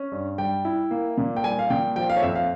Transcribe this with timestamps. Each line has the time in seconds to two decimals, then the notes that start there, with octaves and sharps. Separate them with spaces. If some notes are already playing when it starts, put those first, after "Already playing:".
Already playing: C#4
0.12 G2
0.38 G3 G5
0.65 E4
0.91 A#3
1.18 A#2
1.37 G5
1.44 G3 G#5
1.59 F5
1.70 A#2 G5
1.96 F3 G5
2.10 F5
2.17 C#5
2.23 F2 E5
2.36 F5